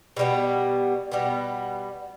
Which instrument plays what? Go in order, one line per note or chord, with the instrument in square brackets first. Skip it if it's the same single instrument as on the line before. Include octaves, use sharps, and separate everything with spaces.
[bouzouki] B2 G3 B3
B2 G3 B3